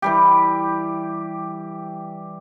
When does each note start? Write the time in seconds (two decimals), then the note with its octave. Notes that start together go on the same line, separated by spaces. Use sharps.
0.02 E3 G3 G4